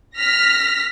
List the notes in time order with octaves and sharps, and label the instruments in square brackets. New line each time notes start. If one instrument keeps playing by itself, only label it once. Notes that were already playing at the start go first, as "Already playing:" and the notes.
[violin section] F6 A#6 B6